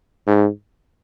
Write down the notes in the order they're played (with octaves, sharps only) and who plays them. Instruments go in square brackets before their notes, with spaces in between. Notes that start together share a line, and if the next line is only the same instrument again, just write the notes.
[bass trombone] G#2